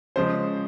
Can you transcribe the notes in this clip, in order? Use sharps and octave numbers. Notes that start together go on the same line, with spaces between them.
C#3 F3 G#3 C5